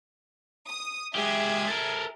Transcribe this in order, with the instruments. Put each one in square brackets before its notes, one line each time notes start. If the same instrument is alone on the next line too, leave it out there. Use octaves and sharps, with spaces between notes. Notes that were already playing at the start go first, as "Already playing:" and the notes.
[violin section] D#6
[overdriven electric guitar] G#3 G4 [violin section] G#4 E5 G#6
[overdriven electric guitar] A4 A#4